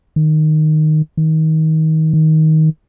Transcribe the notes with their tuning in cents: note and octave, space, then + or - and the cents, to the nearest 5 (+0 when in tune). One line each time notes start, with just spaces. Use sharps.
D#3 -10
D#3 +25
D#3 +15